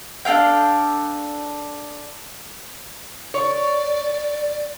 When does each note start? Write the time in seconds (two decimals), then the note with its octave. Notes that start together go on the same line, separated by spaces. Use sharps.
0.25 D4 A4 F5 G5
3.34 C#5 D5